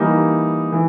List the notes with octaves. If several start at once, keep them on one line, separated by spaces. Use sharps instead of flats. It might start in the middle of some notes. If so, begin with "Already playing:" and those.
Already playing: E3 G3 A#3 D#4
E3